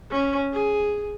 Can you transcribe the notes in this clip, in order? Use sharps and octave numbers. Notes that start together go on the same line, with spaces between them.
C#4
G#4